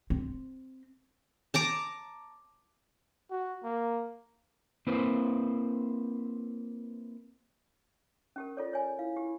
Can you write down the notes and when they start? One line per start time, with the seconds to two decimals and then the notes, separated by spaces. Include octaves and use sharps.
0.10 C4
1.54 A5 A#5 D6
3.31 F#4
3.63 A#3
4.87 A#3 C4 E4 B4 C5
8.36 C#4 G4 A#4
8.57 F4 A4 C#5 D5
8.73 C#5 G#5
8.99 E4 F5
9.17 G4